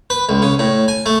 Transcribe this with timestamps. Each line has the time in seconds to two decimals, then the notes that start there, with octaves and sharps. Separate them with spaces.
0.10 B4
0.29 C#2
0.42 C#3
0.59 A2
0.88 G#5
1.06 A3